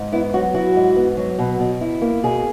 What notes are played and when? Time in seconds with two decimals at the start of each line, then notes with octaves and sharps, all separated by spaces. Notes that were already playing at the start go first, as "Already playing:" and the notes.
Already playing: G#2
0.12 B3 E4
0.33 F#3 F#4
0.54 E4 F#4
0.76 G#2
0.96 B3
1.17 F#3
1.39 B2
1.60 B2
1.81 E4
2.01 A#3
2.23 B2 G#4